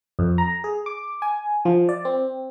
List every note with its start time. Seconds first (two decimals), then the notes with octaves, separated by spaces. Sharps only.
0.19 F2
0.38 A#5
0.64 G#4
0.86 D6
1.22 G#5
1.65 F3
1.89 D5
2.05 C4